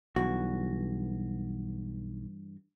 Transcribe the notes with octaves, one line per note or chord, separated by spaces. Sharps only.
B1 G2 E3 F#4